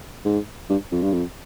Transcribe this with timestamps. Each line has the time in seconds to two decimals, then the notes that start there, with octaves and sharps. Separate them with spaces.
0.25 G#2
0.69 G2
0.92 F2
1.02 G2
1.13 F2